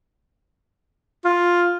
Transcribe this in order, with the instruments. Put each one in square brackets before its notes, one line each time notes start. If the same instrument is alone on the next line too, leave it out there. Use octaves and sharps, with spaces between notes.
[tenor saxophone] F4